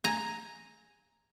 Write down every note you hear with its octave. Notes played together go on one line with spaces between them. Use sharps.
G#5 A#5